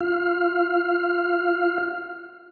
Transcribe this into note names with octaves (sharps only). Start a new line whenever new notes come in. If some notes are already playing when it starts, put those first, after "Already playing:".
F4 F5 F6